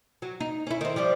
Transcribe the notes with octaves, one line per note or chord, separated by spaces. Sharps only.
F#3
D#4
C#4 E4
D#3 C4
F3 G3 D4